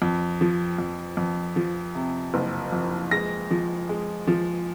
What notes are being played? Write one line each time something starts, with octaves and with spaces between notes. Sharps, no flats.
F2
F3
F2
F2
F3
C3
F#1
F2
G#3 A#6
F3
G#3
F3